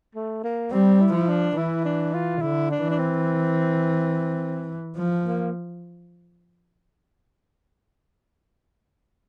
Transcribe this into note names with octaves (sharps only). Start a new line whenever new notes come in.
A3
A#3
G3 C4
E4
F3
D4
E3 E4
D4
F4
D3 E4
D4
E3
D4
C4
F3
A#3